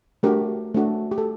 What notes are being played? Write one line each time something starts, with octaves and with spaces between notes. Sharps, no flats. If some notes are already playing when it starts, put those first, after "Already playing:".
A3 D4 F#4 G4 A#4
A3 D4 F#4
G4
A4